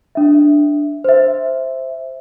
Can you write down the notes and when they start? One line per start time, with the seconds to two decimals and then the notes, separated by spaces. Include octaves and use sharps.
0.15 D4 E5
1.04 C5 E5